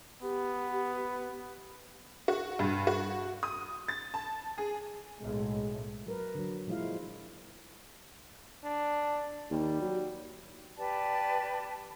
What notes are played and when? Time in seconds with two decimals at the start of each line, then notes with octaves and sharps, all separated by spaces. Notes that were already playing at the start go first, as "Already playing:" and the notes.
0.22 B3 G4
2.28 F#4
2.59 G2
2.87 F#4
3.43 D#6
3.88 A6
4.14 A5
4.58 G#4
5.21 B1 A2 G#3
6.06 F#3 A#4 B4
6.35 D3 F#3
6.67 A#2 F3 G#3 E4 F4 F5
8.64 D4
9.51 D#2 G3
9.81 F#3
10.77 G4 B4 D5 A5